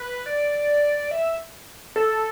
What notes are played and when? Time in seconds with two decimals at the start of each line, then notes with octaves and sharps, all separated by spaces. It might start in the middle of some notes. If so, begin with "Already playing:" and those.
Already playing: B4
0.26 D5
1.11 E5
1.96 A4